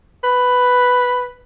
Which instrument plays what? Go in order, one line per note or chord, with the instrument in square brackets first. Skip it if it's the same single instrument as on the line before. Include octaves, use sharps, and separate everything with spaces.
[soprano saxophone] B4